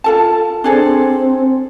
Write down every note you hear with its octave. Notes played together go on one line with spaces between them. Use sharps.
F4 A4 A5
C4 D4 G#4 A4